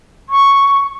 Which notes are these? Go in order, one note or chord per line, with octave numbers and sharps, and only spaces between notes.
C#6